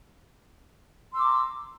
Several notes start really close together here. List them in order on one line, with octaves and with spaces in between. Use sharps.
C6 E6 D6 A#5